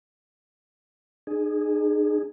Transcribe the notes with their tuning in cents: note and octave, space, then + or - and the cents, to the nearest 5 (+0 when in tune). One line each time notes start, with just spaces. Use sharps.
D#4 -40 G#4 +5